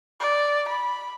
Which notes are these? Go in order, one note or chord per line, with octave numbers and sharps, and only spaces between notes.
D5
B5